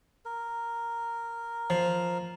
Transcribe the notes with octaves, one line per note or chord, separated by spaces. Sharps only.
A#4
F3